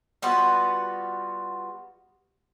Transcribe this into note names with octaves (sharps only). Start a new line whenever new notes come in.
G3 B3 F4 F#4